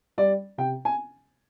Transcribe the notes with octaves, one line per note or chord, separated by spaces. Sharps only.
G3 D5
C3 G5
G#5